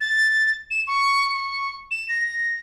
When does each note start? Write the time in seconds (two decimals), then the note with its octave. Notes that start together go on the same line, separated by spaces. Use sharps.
0.01 A6
0.71 E7
0.87 C#6
1.35 C#6
1.91 E7
2.09 A#6